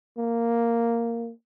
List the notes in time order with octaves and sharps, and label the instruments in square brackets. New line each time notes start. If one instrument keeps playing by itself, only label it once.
[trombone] A#3